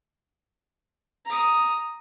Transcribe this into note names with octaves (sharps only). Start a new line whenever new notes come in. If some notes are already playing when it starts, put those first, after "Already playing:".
A#5 D#6